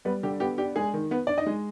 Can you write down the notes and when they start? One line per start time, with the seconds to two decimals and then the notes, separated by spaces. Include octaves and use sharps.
0.05 G3 B3 B4
0.23 D3 G4
0.40 B3 G4
0.58 D4 G4
0.76 G#3 G#4
0.94 D#3
1.11 B3 B4
1.27 D4 D5
1.38 D#4 D#5
1.46 G#3